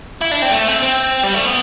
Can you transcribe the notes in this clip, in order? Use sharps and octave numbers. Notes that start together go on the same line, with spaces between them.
E4
D4
C4
A3
C4
C4
G3
A3
B3